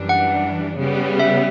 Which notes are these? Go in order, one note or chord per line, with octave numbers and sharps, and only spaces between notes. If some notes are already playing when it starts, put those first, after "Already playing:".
Already playing: F#2 E3 G3 D4
F#5
C#3 G3 B3
E5